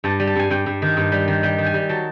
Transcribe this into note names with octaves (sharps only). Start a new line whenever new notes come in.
G2 A5
G3
A5
G2 G#5
G2 G5
G2
D#3
G2
G3
D#3
G3 G5
D#3
G#5
G3
F#3 A5